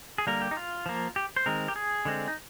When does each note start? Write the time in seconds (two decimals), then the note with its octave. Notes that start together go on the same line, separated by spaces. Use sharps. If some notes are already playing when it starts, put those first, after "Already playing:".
0.18 G#4
0.27 D3 G3 A#3 A#4
0.42 G4
0.51 D#4
0.57 F4
0.86 F3 A#3
1.16 G4
1.36 C5
1.46 D#3 G#3 C4 A#4
1.68 G4
1.76 G#4
2.05 D3 G#3 C4
2.28 D#4